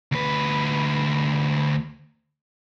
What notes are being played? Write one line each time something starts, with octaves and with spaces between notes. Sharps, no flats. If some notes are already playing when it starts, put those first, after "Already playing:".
D2 B4